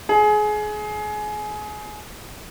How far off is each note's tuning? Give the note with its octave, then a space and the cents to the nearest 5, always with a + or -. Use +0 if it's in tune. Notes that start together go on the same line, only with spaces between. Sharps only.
G#4 +25